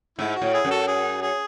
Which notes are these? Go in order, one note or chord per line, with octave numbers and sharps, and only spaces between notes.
G#2 A3 E4
F#4
A2
E4 G#4
F#2
F#4 A4
G#4
G#4